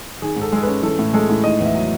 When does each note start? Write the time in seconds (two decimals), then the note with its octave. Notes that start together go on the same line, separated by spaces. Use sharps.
0.22 D#3 G#4
0.36 G#2
0.41 A4
0.52 G#3 A4
0.62 C#4 B4
0.82 E3 A4
0.99 A2
1.13 G#3 A4
1.29 A2
1.44 D#3 D#5
1.60 E2 E5
1.75 F#3